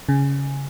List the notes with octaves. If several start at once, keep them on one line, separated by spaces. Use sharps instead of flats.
C#3